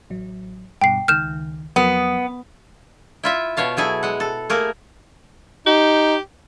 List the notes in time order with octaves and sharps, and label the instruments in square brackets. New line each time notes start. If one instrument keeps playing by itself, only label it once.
[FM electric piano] A1 F#3
[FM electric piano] G2 B2 [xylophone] G5 C7
[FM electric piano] C#2 D#3 [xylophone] F6 G6 E7
[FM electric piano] F2 F#3 A#4 [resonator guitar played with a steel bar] B3
[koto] E4 F4 E5
B2 C#5 F5 A5
F#3 E4 G#4 A4
G#3 F#5
A4
A3 A#3 G#4 A#4
[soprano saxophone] D#4 [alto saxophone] G4